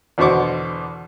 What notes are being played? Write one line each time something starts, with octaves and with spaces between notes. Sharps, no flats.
E2 B2 D3 C5 C#6 D6